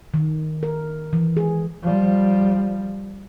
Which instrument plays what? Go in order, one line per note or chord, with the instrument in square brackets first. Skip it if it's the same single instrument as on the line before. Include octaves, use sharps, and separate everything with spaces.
[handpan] D#3
A#4
E3
G#4
[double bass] F3 G3